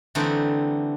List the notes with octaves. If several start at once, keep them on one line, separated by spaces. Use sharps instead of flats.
D3 E3 G3 A3 C4 D#4